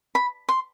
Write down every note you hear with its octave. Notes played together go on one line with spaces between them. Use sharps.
B5
C6